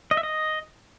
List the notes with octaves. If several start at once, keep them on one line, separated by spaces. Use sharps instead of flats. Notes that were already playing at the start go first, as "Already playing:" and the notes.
D#5
E5
D#5